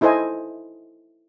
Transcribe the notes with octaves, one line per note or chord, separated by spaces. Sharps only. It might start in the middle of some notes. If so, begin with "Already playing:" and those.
D#4 E4 A4 C5 D#5 G#5